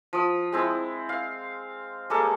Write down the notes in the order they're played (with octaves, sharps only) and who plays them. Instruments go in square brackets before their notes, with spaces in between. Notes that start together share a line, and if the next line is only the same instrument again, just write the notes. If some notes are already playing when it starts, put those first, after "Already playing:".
[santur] F3 D#6
G#3 C4 E4
F5
G3 G#3 A#3 A4